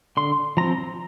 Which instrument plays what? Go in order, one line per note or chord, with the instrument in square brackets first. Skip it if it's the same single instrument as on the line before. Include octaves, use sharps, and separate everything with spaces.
[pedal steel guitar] D3 C6
F3 C4 A#5